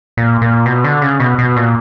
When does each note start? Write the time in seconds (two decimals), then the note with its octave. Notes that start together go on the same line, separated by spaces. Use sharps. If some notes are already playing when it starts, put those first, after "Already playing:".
0.17 A#2
0.41 A#2
0.66 B2
0.84 D3
1.02 C#3
1.20 B2
1.39 B2
1.56 A#2